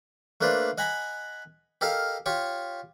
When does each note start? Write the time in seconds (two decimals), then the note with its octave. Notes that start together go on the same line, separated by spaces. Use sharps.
0.41 A3 A#3 D4 B4 C5 D5
0.78 D#5 F#5 G#5 A#5 B5
1.81 G4 A4 A#4 D#5 F5 A5
2.26 F4 G4 C#5 C#6